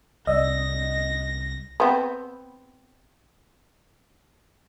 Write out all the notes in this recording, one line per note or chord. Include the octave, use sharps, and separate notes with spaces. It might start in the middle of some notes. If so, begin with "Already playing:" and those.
C2 D5 D#5 E6 A#6
B3 C4